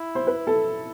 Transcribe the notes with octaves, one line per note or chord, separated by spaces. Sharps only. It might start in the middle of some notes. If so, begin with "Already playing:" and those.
Already playing: E4
C5
B4
A4